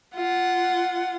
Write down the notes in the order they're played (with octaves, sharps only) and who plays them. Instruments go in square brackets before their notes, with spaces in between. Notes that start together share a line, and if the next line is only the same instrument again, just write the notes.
[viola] F4 F#5